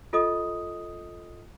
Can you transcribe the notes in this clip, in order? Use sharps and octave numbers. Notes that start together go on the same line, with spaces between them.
F4 A4 D#5 D#6